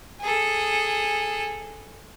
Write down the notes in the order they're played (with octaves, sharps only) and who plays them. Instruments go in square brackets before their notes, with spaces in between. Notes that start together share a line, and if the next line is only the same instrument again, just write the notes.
[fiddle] G#4 A4